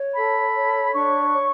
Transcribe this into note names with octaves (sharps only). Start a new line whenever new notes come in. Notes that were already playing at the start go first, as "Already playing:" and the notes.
Already playing: C#5
A4 B5
C#5
D4 C#6
C#5